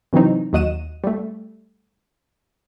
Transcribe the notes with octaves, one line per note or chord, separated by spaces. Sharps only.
C3 E3 F#3 C4 D#4
D#2 F#3 D#5 F#5 D#7 E7
G3 A3